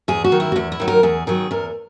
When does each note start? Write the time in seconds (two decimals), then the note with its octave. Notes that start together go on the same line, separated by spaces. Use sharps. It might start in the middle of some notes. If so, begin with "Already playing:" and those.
0.08 E2 G#4
0.24 F#4
0.32 D#3 F#3
0.40 E4
0.52 F#4
0.56 E2 E4
0.72 E4
0.80 D#3 F#3
0.88 A#4
1.03 E2 G#4
1.27 D#3 F#3 G#4
1.51 E2 A#4